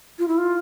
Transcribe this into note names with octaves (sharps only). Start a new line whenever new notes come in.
F4
E4
F4